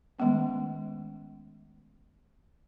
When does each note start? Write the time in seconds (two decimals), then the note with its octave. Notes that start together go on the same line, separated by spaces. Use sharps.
0.19 D#3 G#3 A3 B3 C#4